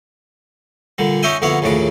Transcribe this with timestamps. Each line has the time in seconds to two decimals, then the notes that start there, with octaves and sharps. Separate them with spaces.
0.98 A#2 D3 G3
1.23 C#4 D#4 C#5 E5 G5 G#5
1.42 A#1 D3 A#3 B3 E4 C#5
1.62 A#1 D#2 A2 C#3 D4 D6